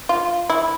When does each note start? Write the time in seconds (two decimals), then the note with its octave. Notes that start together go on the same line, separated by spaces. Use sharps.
0.09 F4
0.50 E4